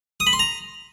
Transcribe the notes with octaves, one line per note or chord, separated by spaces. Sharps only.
D#6
B5
C6
A#5